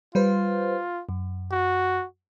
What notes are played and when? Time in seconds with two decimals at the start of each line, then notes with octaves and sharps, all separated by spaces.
0.15 G3 F4 B4 C5
1.09 F#2
1.52 F#4